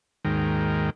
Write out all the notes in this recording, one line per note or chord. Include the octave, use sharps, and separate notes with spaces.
D#2 G#2 D#3 G#3 A#4 G5